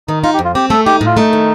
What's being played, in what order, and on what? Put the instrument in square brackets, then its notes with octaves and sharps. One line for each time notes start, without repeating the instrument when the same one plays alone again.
[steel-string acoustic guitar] D#3 [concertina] D#4
[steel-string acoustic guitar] D#4 [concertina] F4
[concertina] G4
[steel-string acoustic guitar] F2
[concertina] F4
[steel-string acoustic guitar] C4 [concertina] G4
[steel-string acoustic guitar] A3 [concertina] A4
[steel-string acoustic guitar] D#4 [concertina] G4
[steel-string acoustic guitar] A2
[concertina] F4
[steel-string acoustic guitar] A3 [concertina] D#4
[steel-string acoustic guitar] D#3